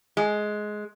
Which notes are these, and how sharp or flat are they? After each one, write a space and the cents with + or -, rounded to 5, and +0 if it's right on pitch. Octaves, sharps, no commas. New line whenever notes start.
G#3 +15